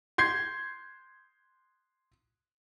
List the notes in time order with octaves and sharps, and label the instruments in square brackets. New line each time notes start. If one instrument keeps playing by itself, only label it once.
[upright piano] C6 G6 G#6 C7